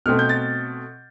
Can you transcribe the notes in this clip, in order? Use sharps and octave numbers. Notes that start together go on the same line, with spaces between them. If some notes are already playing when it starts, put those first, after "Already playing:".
B2 A3 C4 F6
G6
A6